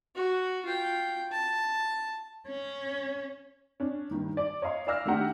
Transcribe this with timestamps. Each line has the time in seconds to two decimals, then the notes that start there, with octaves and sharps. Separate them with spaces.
0.16 F#4
0.65 F4 G5
1.32 A5
2.48 C#4
3.80 C#4 D4
4.11 G2 D#3
4.37 D5
4.62 C#5 D#5 F5 C6
4.87 D5 F5 E6 F6 A#6
5.05 D#3 A3 D4 G4 F#5 G5